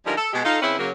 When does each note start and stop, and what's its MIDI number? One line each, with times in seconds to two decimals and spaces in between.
0.06 0.15 50
0.06 0.15 53
0.06 0.15 55
0.06 0.15 56
0.06 0.15 63
0.06 0.15 70
0.17 0.30 69
0.33 0.41 47
0.33 0.41 56
0.33 0.41 67
0.45 0.59 63
0.45 0.59 65
0.45 0.59 69
0.62 0.78 49
0.62 0.78 60
0.62 0.78 61
0.62 0.78 64
0.62 0.78 71
0.79 0.91 49
0.79 0.91 54
0.79 0.91 58